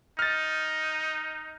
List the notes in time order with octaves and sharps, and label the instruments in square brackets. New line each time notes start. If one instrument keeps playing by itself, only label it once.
[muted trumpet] D#4 [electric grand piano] F6 A6